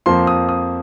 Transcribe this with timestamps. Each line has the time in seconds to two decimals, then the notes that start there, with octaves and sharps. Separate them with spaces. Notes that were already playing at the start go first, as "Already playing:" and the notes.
0.06 F2 F3 A#3 C6
0.27 D#6
0.49 D#6